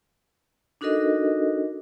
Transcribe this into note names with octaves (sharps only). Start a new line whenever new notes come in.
D4 D#4 F#4 A4 A#4 D#5